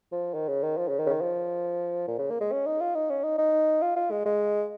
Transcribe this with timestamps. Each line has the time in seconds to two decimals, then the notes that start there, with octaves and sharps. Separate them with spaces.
0.12 F3
0.34 D#3
0.49 C#3
0.63 D#3
0.77 F3
0.88 C#3
0.99 D#3
1.06 C#3
1.09 D#3
1.21 F3
2.08 A#2
2.19 C#3
2.30 A#3
2.40 G#3
2.52 C#4
2.66 D#4
2.80 F4
2.95 D#4
3.10 C#4
3.24 D#4
3.38 D#4
3.82 F4
3.96 F4
4.11 G#3
4.26 G#3